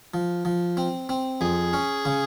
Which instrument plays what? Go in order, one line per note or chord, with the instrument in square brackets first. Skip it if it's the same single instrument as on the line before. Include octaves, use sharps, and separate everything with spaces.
[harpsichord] F3
F3
C4
C4
[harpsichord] F2 [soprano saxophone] G#4
[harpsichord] C#4
C#3